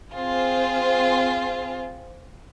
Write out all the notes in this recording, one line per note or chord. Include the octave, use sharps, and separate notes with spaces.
C4 F4 G#4 C5